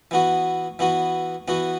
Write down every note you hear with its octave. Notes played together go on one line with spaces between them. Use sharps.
E3 B3 F#4
E3 B3 F#4
E3 B3 F#4